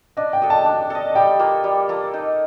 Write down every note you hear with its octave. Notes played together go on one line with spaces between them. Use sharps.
D4 D#5
G5
A4 D#5
A5
D4
A4 D#5
G3 G5
A#3 F4 A4
G3
A#3 F4 A4
D#4